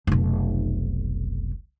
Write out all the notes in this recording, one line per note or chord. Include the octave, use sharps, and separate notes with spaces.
F1 B1